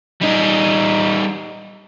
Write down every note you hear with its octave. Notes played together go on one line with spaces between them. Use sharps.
G3 D#4